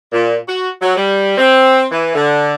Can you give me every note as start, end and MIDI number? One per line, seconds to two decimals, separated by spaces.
0.13 0.37 46
0.48 0.69 66
0.81 0.97 54
0.97 1.36 55
1.37 1.85 60
1.91 2.15 52
2.15 2.55 50